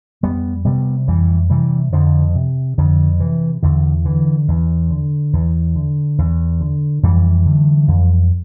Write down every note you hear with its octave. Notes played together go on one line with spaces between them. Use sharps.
F2 G3 B3
C3 G3 B3
F2 E3 G3
C3 E3 G3
F2 D3 F3
C3
F2 D3
C3 E3
E2 D3
D3 E3
E2
D3
E2
D3
E2
D3
F2 E3 G3
D3
F2